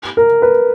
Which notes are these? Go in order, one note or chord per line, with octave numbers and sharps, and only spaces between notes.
A#4
B4